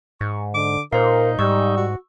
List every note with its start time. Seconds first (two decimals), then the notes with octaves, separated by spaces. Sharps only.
0.21 G#2 C#6
0.54 D3 D6
0.93 A#2 D#4 A#4 C5 F5
1.39 G#2 G3 C#6 E6
1.77 F#4